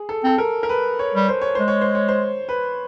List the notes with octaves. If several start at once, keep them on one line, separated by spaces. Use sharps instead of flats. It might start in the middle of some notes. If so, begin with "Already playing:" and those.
Already playing: G#4
A4
C4 A4
A#4
A#4
B4
C#5
G3
C5
C#5
G#3 C5
C#5
C5
C#5
C5
B4